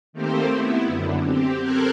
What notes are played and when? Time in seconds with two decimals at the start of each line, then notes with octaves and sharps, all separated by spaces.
0.13 D#3 A3 A#3 C4 G4 C5
0.48 B3 E4
0.85 F#2 D3
1.22 C4 G4
1.60 A4 A#4 C5 F6 F#6 G#6